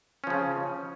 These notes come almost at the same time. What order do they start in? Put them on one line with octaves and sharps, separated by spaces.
C#4 F3 C#3